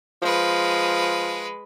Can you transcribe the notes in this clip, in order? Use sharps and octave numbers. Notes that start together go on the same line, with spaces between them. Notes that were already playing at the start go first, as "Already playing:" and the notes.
F3 G#3 B4